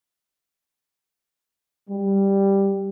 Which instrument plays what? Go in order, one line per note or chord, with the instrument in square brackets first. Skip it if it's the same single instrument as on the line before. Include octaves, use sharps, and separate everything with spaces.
[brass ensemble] G3